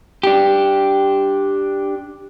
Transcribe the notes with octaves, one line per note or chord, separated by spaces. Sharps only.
D4 G4